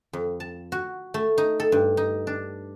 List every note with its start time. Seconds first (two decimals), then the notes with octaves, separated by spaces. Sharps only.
0.13 F2
0.40 A5
0.72 F#4
1.14 A3
1.38 D#4
1.60 A4
1.72 G2
1.97 D#4
2.27 D4